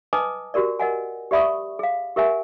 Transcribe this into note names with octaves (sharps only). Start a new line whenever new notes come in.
B4 D#5 G#5 A5 D6 D#6
F#4 G4 A#4 D5
A#4 D#5 F#5 G#5
G4 D5 E5 B5 C#6 D#6
G#4 F5
G4 A#4 E5 F#5 G#5